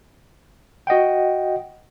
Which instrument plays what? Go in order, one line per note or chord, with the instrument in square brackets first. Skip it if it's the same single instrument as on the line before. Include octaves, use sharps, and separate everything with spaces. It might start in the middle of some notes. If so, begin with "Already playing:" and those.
[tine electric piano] F#4 D#5 F#5 G5